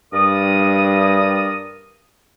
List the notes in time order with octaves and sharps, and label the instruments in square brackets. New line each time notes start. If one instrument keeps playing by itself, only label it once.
[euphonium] G2 [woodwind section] A#4 D5 D#6